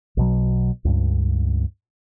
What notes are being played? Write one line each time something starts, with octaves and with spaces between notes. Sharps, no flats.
B1 B2 F#3
C#2 G2